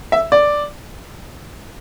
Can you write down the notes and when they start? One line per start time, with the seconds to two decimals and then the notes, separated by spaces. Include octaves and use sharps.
0.12 E5
0.32 D5